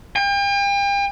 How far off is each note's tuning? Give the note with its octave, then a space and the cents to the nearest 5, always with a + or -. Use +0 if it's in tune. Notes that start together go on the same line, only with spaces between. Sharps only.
G5 +40